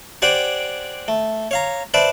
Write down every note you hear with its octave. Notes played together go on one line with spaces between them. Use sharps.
G4 C5 D5 F#5 G#5
A3
C#5 F5 A#5
B4 C5 D5 E5 A5